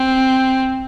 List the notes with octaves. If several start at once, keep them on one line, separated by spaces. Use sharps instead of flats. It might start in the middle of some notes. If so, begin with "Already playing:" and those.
Already playing: C4